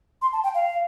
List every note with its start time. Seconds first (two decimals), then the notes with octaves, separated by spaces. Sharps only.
0.22 C6
0.33 A5
0.44 G5
0.55 F5